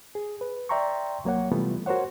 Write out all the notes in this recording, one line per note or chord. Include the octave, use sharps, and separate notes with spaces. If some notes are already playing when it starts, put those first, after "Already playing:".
G#4
B4
D5 E5 G5 A#5 C6 C#6
C2 F#3 A#3 C#5 F#5
C3 E3 G3 A3 B3 F4
F#4 A#4 C5 C#5 F#5